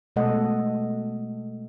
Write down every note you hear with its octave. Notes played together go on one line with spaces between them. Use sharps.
B2 G#3 A3 A4 D#5 F#5